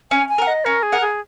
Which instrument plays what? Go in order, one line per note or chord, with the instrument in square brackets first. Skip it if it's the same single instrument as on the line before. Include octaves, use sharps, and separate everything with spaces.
[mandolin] C#4 [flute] G#5
[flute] G#5
[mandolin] A#4 F#5
[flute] D#5
[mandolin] C#4 [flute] A#4
[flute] G#4
[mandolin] A#4 F#5
[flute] G#4